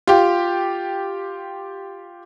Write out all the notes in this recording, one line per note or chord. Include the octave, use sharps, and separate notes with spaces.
F4 G4